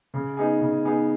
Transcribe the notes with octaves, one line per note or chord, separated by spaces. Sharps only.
C#3
B3 D#4 G#4
C#3
B3 D#4 G#4